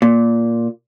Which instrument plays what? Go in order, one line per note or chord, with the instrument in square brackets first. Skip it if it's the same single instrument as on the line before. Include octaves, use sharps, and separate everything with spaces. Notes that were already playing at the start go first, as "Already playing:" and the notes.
[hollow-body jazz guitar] A#2